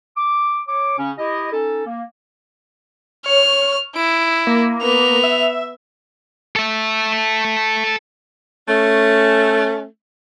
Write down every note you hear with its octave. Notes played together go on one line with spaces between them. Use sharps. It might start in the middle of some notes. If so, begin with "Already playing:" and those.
D6
C#5 D6
C#3 C#4
E4 G4 D#5
C#4 D#4 A4
A#3
C#5 F6
E4 D7
A#3
B3 F7
E5
A4 E5
A3 C#4